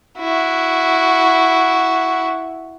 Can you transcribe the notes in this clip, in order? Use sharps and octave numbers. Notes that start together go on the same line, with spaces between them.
E4 F#4